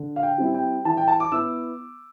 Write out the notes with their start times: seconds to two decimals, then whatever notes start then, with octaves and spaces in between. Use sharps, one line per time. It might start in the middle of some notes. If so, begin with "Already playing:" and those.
Already playing: D3
0.16 F5
0.23 G5
0.38 G3 C4 E4
0.54 G5
0.85 E3 A5
0.97 G5
1.08 A5
1.20 D6
1.32 B3 E4 E6